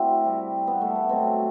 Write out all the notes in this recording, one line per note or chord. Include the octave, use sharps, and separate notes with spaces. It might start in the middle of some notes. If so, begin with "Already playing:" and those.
Already playing: A3 C4 D4 E4 F#4
C3 G3
B3
A3
B3
B2 F#3 C4